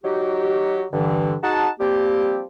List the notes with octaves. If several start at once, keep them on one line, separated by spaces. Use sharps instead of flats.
F#3 D#4 F#4 G4
G2 D3 E3
D#4 F#4 G#4 F#5 A5
F3 G3 A#3 C4 G4